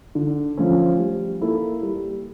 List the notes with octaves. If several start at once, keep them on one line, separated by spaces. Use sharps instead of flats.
D3
F3 A3 C#4
G3
A#3 E4 A4
G3